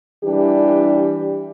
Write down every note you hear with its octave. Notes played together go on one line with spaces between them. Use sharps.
E3 G3 D4 G4